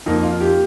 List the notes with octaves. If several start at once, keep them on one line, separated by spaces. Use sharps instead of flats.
F2 F3 A#3 D#4
F4
G4